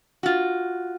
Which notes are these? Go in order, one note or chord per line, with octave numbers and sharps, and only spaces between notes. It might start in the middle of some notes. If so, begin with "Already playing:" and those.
F4 F#4